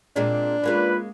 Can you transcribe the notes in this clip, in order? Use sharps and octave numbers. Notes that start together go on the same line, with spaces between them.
A#2 G#3 C4 D4
G#3 A#3 C#4 F4 B4